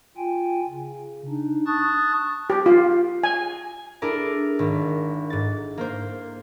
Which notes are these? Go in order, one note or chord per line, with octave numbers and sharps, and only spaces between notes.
F4 G5 G#5
C#3
D4 D#4
A5 C#6 D#6 F#6 A6
G4
F4
G#5
D4 E4 G#4 A#4 D5
G#1
G#2 A6
A#3 C5